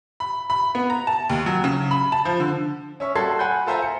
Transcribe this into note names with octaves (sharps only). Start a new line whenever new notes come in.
B5
B5
B3
A#5
A5
D#2
F#3
C#3
B5
A5
F3
D3
C#4 E5 C#6
G3 F#4 A4 C6 G#6 C7
F#5 G#5 B5 G6
F4 A4 C5 E5 G#5 A#5
C#7